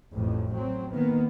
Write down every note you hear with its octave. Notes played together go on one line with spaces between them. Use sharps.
A1 F2 A2
F#3 C4
D#3 A#3 B3